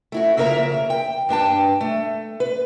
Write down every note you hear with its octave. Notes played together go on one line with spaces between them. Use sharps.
A3 E4 F#4
F2 C#3 A#3 A#4 E5 A#5
G5
G2 D4 G5 A5
A3
B4